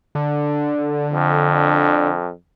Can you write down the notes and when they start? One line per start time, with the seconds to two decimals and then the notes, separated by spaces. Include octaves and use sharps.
0.15 D3
1.13 F2